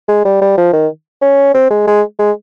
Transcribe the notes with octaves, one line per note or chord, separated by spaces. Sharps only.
G#3
G3
G3
F3
D#3
C#4
C4
G#3
G#3
G#3